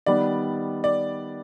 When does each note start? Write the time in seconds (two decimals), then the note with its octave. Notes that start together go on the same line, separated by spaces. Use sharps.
0.06 D#3 G3 B3 D5
0.84 D5